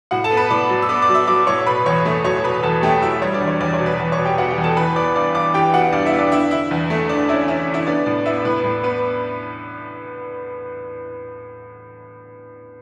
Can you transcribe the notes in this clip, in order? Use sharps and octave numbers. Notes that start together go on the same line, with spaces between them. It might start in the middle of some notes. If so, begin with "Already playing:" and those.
A2 F#4 F#5
A4 A5
B3
B4 B5
A2 D5 D6
F#3
E6
B3 D5 D6
D5 D6
F#3
E5 E6
F#3 D5 D6
A2 C#5 C#6
B2 B4 B5
E2 C#5 C#6
A3
F#3 C#5 C#6
B2 B4 B5
E2 A4 A5
A3 G4 G5
F#3 E4 E5
G3 C#5
D4 D5
E2
C#5
E2 D4 D5
C#5
B2
B4
E2
C#5 C#6
B2
G4 G5
B3 F#4 F#5
G4 G5
E2
A4 A5
E3 B4 B5
B3 D5 D6
G2 D5 D6
G2 D5 D6
E3 G4 G5
B3 F#4 F#5
G2 D4 D5
E4 E5
B3
D4 D5
D3 E4 E5
D3 E4 E5
E2
A3
D3 D4 D5
C#4 E4 E5
C#4 E4 E5
D3
E4 E5
B3 D4 D5
A2 D4 D5
D5
B3 E4 E5
A2 B4
A2
B3 B4